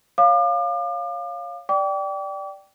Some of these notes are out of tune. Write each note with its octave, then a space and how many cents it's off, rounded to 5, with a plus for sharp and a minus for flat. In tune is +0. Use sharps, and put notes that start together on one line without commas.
C#5 +0 F5 +0 D6 +40
D5 +0 G5 -15 D6 -40